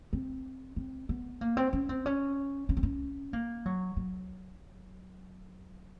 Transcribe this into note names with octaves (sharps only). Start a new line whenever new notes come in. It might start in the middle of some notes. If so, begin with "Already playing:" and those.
C4
C4
B3
A#3
C4
C#4
C4
C#4
C#4
C4
C#4
A#3
F#3
F#3